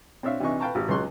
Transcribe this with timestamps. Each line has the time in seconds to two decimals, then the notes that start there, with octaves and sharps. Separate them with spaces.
0.23 C4 D4 C#5 E5 F5
0.40 C3 E3 D4 D#4 C#6
0.60 B4 F5 G5 A5 A#5 C#6
0.75 G#1 G4
0.88 C#2 F#3 G#3 C6 C#6 F#6